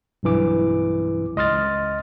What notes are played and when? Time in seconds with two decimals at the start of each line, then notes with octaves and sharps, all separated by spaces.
0.23 B1 G2 E3 D6
1.36 C#2 D#5 C6 F6 A6